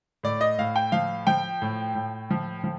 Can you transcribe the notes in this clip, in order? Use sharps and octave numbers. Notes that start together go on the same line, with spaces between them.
A2 D5
D#5
A2 F5
G5
F3 F5
F3 G5
A2
A2
F3
F3